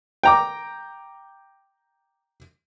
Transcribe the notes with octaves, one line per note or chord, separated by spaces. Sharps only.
G5 A#5 D6